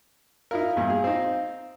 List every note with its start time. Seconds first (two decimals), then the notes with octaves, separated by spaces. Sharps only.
0.51 D#4 E4 A#4 F5
0.76 E2 G2 A#2
0.90 G#4
1.04 C4 D#4